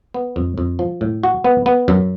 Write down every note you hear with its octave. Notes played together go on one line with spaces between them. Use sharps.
B3
F2
F2
F3
A2
F#4
B3
B3
F#2